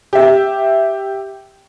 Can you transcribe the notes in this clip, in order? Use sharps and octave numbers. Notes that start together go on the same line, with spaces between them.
G4 E5